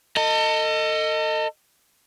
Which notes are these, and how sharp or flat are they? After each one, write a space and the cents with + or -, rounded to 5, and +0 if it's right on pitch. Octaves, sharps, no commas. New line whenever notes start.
A4 +35 D#5 +0